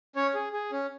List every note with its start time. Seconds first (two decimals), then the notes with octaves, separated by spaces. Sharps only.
0.16 C#4 C#5
0.34 G#4
0.53 G#4
0.72 C#4